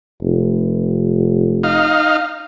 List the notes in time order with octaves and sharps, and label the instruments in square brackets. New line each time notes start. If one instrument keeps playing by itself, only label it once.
[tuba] F1
[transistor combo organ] D#4 F5